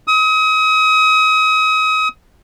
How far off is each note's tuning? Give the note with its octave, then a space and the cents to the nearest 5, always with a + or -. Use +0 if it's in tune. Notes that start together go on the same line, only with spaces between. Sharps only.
D#6 +35